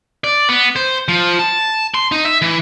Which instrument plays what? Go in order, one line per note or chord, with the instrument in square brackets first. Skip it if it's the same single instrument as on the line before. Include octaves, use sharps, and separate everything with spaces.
[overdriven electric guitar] D5
B3
C5
F3
A5
C6
D#4
E5
E3